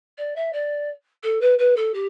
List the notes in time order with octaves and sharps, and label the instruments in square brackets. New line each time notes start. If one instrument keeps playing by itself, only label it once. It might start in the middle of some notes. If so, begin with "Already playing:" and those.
[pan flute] D5
E5
D5
A4
B4
B4
A4
G4